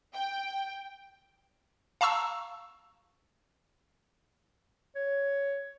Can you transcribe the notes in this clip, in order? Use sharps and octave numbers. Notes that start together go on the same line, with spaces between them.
G5
F5 A5 A#5 C#6 E6
C#5